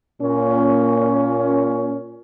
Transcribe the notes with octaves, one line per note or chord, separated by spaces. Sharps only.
A#2 C#4